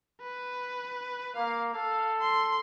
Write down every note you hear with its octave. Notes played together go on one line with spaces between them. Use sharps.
B4
A#3 F5
A4 F5
C6